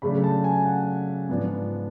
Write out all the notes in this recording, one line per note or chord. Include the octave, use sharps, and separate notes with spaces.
C#3 F#3 A3 D4 B5
A5
G#5
F#5
G#2 F3 B3 D4